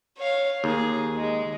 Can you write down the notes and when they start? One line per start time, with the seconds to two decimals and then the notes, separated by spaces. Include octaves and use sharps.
0.18 C#5 F5
0.64 D#2 G#4
1.15 G#3